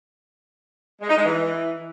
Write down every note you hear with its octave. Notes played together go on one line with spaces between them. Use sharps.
G#3
D#4
G#3
E3